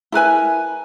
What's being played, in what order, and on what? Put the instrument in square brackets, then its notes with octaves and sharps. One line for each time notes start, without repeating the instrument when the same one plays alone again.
[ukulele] E4 A#4 B4 G#5